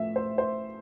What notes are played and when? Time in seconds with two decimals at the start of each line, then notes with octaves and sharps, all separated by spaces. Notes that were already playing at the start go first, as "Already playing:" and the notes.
Already playing: A2 F3 A3 E5
0.16 C5
0.38 C5